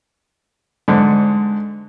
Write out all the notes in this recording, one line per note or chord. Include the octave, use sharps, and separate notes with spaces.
G#2 D3